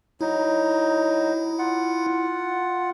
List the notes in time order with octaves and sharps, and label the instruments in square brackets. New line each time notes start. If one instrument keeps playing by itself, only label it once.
[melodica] F#3 D#4 [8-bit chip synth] E4
[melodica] F4 F#5